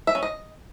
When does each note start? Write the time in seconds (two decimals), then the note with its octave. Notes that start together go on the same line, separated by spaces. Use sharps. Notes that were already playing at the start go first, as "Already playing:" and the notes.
0.07 E5
0.15 C#4
0.23 D#5